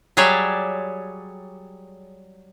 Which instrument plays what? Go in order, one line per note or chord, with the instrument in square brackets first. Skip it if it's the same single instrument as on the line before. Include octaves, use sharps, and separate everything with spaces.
[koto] F#3 G3 G#4 C#5 D5 E5